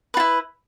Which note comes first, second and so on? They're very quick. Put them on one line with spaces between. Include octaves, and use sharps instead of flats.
B4 F4 E4